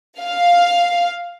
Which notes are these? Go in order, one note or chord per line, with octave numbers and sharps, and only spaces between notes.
F5